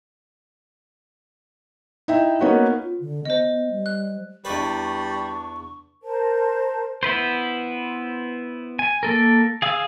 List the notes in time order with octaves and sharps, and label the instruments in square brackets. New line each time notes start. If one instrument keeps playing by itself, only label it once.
[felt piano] D#4 E4 E5 G5
A#3 B3 C#4 D#4 F#4 B4
[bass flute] F4
D3
[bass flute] B3 [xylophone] C5 D#5
[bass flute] G3
[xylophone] F#6
[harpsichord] E2 B4 [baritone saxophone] G3 [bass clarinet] D4 [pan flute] C#6
[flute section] A#4 C5 A5
[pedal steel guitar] B3 E4 B4 C5
G#5
A#3 A4 A#4
G#4 F5 D#6 E6